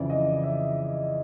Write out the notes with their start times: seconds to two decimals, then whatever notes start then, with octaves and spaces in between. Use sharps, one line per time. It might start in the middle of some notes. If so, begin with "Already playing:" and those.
Already playing: F2 C#3 E3 D5
0.10 D#5
0.44 E5